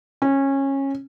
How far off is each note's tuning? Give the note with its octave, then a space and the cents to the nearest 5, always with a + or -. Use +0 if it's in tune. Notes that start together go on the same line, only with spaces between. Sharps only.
C#4 -20